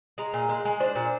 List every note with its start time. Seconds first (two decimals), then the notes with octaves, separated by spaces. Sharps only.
0.18 G#3 A#5
0.33 A#2
0.49 G#3
0.65 G#3
0.80 D4 C5
0.95 A#2